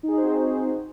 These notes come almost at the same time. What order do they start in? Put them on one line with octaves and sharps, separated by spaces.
D#4 G#4 F#4 C5 C4